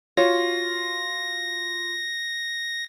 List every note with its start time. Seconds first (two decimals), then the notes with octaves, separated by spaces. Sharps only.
0.17 F4 F#4 C#5 A#6